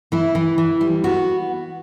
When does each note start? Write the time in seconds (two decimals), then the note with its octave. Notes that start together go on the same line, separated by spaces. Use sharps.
0.12 E3 E4
0.35 E3
0.58 E3
0.81 G3
1.04 B3 F#4